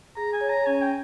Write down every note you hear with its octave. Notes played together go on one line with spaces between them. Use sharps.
G#4 A#5
G#5
C#5
A#5
C#4 G#5
G5